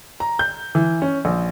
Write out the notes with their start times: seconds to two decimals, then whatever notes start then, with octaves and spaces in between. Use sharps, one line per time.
0.20 A#5
0.39 G6
0.75 E3
1.02 C#4
1.25 A#1